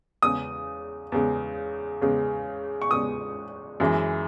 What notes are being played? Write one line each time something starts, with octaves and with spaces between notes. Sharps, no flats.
E2 C#3 G#3 D#6
E2 C#3 G#3
E2 C#3 G#3
C#6
E2 C#3 G#3 D#6
F#2 E3 G#3